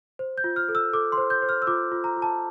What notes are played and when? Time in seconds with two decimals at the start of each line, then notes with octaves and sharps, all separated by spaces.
0.19 C5
0.38 G6
0.44 F4
0.56 F6
0.69 A4
0.75 E6
0.93 A4 D6
1.12 C6
1.18 C5
1.30 G6
1.42 C5
1.49 F6
1.62 E6
1.67 F4 D6
1.92 F4
2.04 A#5
2.17 F4
2.22 A5